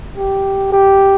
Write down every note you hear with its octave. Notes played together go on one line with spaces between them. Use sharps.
G4
G4